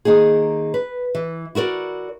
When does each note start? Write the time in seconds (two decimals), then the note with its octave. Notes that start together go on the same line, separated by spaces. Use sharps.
0.05 D#3 A#3 D#4 G#4
0.74 B4
1.15 E3
1.55 E4 F#4 A#4 D5